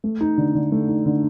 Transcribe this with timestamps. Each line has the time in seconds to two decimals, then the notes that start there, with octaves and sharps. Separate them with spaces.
0.04 A3
0.21 D#4
0.38 D3
0.55 D3
0.72 A3
0.89 D#4
1.06 D3